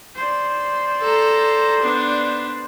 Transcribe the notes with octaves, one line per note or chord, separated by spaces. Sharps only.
C5 D5
A4 A#5
B3 D4